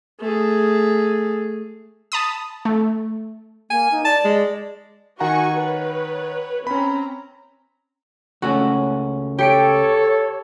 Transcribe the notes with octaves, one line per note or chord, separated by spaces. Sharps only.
A3 G#4
A5 B5 D#6
A3
A#3 G#5
D#4
D5 A5
G#3
D#3 F#4 F#5 G#5 A#5 C#6
B4 C#5
C4 C#4 A#5 B5
C#2 A3 C#4 F#4
G4 A4 C#5 C#7 D7